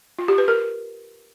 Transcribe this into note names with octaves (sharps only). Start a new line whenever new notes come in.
F4
G4
B4
A#4